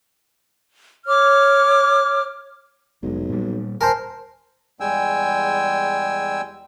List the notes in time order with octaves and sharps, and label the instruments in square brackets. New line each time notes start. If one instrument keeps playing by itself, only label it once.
[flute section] C#5 D6 F6
[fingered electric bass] F1 G#3 [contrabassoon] B1
[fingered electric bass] A#2 G3
[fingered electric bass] D1 [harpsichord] A#4 C5 [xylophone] G#5 A5 G6
[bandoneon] E2 G3 G#3 G5 G#5 E6